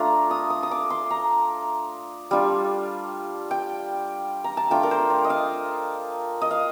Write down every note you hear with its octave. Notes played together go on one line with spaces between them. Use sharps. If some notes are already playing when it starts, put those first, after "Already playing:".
Already playing: A3 D4 F4 A#5
D#6
D#6
D#6
D6
C6
A#5
G3 D4 F4
G5
A#5
A5
A3 D4 F4 G5
A#4
C5
D5
D#5
F5
D#5
F5